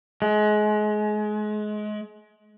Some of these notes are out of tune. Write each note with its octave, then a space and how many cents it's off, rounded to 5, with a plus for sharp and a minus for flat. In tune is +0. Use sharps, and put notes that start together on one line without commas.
G#3 +30